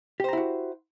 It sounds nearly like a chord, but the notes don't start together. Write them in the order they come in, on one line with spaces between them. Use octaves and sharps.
G4 C5 A#5 E4 F#4